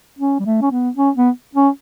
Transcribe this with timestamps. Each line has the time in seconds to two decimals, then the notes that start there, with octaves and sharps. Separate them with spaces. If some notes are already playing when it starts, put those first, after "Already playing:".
0.19 C#4
0.40 G3
0.46 A3
0.62 C#4
0.72 B3
0.97 C#4
1.17 B3
1.55 C#4